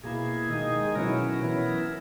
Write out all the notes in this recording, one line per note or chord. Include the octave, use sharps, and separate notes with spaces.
B2 A#3 E4 G#4
D#3 G#3 D#4
B2 F#3 C#4 E4 A#4
E3 B3 E4